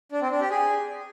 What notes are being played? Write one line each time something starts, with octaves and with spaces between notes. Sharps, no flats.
D4
C4
D4
G4
G#4